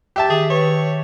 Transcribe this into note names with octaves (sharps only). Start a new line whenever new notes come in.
G4 E5 A5
D#3 G#4
B4 C#5